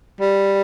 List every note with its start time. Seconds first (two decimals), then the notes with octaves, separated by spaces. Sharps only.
0.21 G3